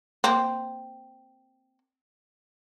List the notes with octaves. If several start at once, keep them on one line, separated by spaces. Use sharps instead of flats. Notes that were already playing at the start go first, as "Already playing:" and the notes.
A#3 C4